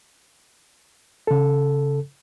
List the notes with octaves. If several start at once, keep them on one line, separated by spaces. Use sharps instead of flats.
C#3 A4